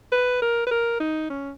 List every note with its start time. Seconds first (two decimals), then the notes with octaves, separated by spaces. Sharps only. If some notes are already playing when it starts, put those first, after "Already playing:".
0.12 B4
0.42 A#4
0.67 B4
0.71 A#4
1.00 D#4
1.30 C#4